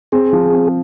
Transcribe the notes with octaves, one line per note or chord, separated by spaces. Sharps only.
C4 G#4
F3
C4